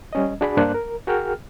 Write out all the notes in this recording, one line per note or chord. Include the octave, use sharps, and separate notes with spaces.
G3 C#4 D#5
D4 F#4 G#4 D5 B5
G2 A#3 D4 C5 F#6
A#4
F#4 G#4 A#4 G5 F6